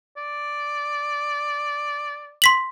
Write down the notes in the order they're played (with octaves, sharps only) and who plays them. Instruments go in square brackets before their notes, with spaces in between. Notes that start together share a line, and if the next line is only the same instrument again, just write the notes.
[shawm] D5
[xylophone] C6 B6 F#7